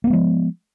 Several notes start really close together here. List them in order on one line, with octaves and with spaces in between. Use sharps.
A#3 B3 G#3 F3